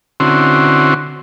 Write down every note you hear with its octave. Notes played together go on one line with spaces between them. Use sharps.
D3 C4 C#4 E4 F#4 C6